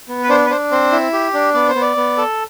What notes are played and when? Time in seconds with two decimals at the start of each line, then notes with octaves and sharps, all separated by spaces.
0.08 B3
0.23 B4
0.29 D4 C5
0.46 B4
0.50 D4 C5
0.71 C4 C5
0.92 E4
1.13 G4
1.34 D4
1.54 B3 D5
1.69 C5
1.75 B3
1.81 D5
1.97 B3
2.17 A4